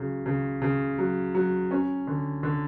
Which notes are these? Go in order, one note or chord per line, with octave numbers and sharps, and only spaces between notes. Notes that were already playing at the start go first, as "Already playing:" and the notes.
Already playing: C#3 F#3
C#3
C#3
F#3
F#3
C#4
D3
D3